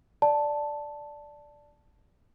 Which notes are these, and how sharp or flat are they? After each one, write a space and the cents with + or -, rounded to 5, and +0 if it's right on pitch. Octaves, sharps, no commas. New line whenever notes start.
D5 +0 A5 +0